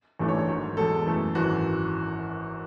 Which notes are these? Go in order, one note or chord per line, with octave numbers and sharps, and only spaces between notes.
A1 G#2 E3 A3 D4
C#5
C#5
G#1 G#2 F#3
E2 B2 G#3 A4
F#2 E3 A3
G#1 F#2 E3 F#4